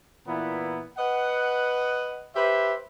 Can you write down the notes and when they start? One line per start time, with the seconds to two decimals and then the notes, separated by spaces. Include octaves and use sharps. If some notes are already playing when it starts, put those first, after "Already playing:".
0.28 A#2 E3 B3 E4 A#5
0.98 B4 D#5 F#5
2.35 G4 B4 C5 E5